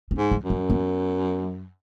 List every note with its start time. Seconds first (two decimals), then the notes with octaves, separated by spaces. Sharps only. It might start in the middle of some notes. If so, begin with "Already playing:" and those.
0.11 C#4
0.18 G#2
0.31 D#4
0.44 F#2
0.50 C#4
0.70 B3